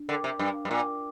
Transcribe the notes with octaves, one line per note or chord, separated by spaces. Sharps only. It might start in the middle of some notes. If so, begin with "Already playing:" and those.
Already playing: D4
D3 A#4 G5 D6
C3
G2 D4
G2
A#2 A#4 G5 D6